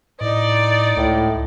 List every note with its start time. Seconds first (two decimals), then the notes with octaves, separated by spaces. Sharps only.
0.21 A2 D#4 D5 D#5
0.97 C#2 A2